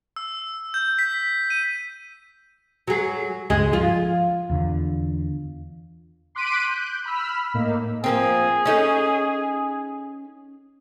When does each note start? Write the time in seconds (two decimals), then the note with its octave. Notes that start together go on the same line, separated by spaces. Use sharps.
0.16 E6
0.74 G6
0.99 B6
1.50 D#7
2.87 F#3 G#4
3.50 C#2 G2 G#3 G#4 D#5
3.73 F3 F4
4.50 E2 D3
6.35 C6 D6 F#6 B6 D7 D#7
6.64 F#6 G6
7.06 B5 E6 F6 B6
7.54 A2 A#3 D#4
8.04 F3 A#3 C4 G#4
8.65 C#4 D#4 A4